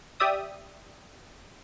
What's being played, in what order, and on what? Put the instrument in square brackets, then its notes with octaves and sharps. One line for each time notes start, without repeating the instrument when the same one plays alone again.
[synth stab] G4 D5 E5 D#6